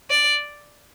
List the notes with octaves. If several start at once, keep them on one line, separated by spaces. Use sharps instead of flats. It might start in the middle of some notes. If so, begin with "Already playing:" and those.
D5